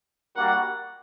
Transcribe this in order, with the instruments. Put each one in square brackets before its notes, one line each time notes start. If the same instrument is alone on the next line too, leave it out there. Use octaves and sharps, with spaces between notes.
[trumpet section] G3 A#3 D4 F#4 A#4 [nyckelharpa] F#5